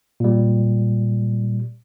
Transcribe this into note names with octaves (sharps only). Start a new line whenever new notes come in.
A#2 G3